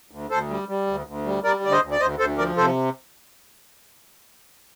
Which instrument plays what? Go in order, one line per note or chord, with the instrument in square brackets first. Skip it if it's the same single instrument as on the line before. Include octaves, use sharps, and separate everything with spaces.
[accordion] D2
D2 A4 C5
G3
G3
D2
D2
G3
G3 A#4 D5
D2 D5
C5 D#5
D2
D5
D2 C5 D#5
D2 A4 C5
F3 A#4 D5
C3 A4 C5